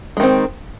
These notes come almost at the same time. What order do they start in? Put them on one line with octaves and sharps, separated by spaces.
G#3 D#3 C4